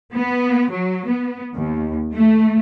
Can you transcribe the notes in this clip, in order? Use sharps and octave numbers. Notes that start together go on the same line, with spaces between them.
B3
F#3
B3
D#2
A3